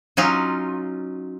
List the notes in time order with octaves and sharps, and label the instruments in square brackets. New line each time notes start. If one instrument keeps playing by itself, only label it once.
[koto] F#3 C#4 D#4 F4